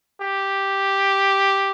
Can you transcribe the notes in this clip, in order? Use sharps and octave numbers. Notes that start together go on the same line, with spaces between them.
G4